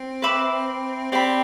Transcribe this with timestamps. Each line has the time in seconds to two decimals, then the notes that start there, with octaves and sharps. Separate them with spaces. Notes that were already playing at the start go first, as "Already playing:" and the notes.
Already playing: C4
0.22 B4 E5 B5 D6
1.12 C4 G4 D5 G5 B5